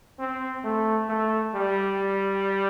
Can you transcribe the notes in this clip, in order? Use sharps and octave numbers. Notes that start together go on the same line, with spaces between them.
C4
A3
A3
G3